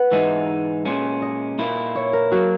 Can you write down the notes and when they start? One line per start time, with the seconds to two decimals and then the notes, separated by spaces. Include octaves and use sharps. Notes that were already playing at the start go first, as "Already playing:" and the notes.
Already playing: B4 F#5
0.12 G#2 E3 G#3 D#4 E5
0.85 A#2 G#3 C#4
1.22 D#5
1.58 A#2 A#3 E4
1.95 C#5
2.13 A#4
2.32 F#3 A#3 F#4